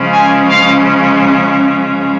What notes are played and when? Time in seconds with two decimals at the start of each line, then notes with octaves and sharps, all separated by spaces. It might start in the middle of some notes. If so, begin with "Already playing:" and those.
Already playing: C#3 F3 G#3 C#4
0.13 G#5
0.50 F5